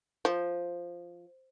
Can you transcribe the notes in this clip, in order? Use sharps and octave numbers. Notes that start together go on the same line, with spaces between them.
F3